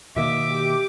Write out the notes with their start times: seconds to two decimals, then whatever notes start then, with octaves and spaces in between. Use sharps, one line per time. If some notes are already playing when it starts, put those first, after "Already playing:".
0.16 B2 D#3 A#3 E5 D6
0.51 G4